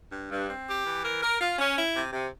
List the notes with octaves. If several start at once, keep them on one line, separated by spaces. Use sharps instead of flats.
G2
G2
C4
G4
E3
A#4
A#4
F4
C#4
E4
C3
C3